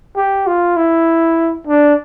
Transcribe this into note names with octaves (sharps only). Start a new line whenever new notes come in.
G4
F4
E4
D4